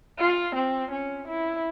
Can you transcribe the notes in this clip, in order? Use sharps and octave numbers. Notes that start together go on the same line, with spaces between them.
F4
C4
C#4
E4